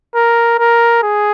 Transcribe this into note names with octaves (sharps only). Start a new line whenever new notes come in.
A#4
A#4
G#4